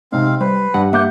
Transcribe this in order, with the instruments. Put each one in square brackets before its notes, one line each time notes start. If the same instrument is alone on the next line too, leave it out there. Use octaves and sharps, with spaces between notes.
[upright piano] G#2 C3 [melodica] C4 F5
[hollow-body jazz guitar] G3 [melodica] B4 [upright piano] C5
[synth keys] G2 [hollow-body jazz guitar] F#5
[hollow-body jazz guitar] A#3 [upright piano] E5 D6 G6 [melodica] F#5